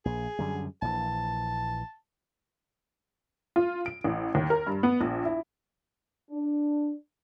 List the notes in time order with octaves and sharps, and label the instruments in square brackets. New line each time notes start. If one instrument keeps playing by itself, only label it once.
[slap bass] A#1 [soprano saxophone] G#4
[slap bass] F#2 D3 G3
[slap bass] A#1 E3 [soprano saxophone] A5
[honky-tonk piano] F4
D7
A1
D#2
A#4
G2
B3
A#1
E4
[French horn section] D4